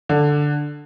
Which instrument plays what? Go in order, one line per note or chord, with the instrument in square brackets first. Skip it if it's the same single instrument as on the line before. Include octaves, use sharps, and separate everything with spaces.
[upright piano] D3